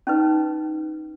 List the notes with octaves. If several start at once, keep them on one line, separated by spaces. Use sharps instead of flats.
C#4 D#4 B4